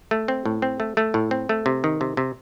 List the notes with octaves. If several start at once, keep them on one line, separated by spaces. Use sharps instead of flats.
A3
C4
A2
C4
A3
A3
A2
C4
A3
C3
D#3
C3
C3